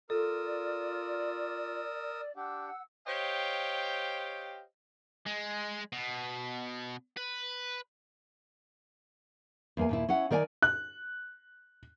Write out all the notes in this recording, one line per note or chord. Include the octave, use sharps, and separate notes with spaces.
F4 A4 A#4 D5 D#6 E6
D4 G4 F#5 E6
G4 C5 C#5 D#5 F5 G5
G#3
B2
B4
E2 A#3 G#5
D#2 A#2 E4
C#4 E4 F#5
D#3 A#4 D5 F5 G#5
F#6